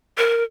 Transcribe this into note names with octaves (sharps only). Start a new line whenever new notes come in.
A#4